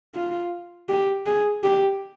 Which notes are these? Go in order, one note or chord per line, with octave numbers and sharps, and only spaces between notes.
F4
G4
G#4
G4